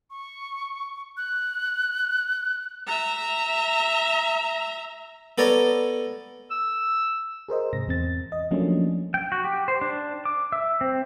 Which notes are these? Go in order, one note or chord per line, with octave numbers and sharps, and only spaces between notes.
C#6
F#6
E5 A#5
B3 A4 C#5 D5 A#5
E6
G#4 A#4 C5 D#5
G#2 C3 A#6
E2 C4 A6
D#5
F3 F#3 A3 A#3 C#4 D4
G5
F#4
G4
C5
D4
D6
E5
C4